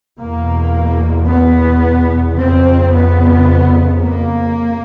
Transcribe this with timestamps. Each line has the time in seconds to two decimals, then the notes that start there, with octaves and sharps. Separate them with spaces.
0.19 E2 B2 A#3
1.28 B3
2.38 F2 C#3 C4
2.94 B3
4.03 A#3